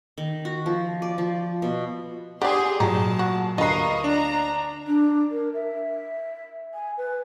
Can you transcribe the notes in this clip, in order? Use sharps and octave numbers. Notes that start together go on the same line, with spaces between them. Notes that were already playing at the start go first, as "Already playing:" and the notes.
D#3
F#4
F3
D5
F3
B2
D3 G4 G#4 D5 G#5 C6
A#2 F#3 D#4 A5
F#4
D2 A#3 F4 B4 D#5 C#6 D#6 C7
D4 A#5
D4
A#4
E5
G#5
B4